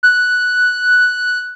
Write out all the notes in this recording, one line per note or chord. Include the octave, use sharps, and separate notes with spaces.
F#6